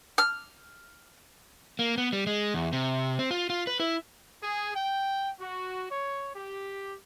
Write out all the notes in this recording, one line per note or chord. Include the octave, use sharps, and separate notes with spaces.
F6
A#3
B3
G3
G#3
E2
C3
C4
F4
F4
B4
E4
G#4
G5
F#4
C#5
G4